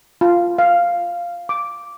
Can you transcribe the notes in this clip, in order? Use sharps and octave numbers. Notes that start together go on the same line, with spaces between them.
F4
F5
D6